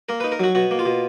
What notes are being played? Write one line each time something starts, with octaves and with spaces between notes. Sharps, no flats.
A#3 A#4
D#4 B4
A#4
F#3 F#4
B2 F#4
A#3
F4
B2